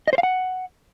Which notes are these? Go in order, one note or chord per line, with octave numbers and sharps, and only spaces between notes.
D#5
C5
F5
F#5